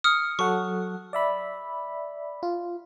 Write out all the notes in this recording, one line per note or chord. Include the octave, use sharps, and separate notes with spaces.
D#6 F6 C#7
F#3 A4 F#5 C#6
D5 E5 B5
F4